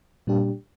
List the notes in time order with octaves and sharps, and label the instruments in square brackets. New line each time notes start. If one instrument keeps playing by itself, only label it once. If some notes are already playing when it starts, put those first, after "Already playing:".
[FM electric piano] A#2 G3 D4 G4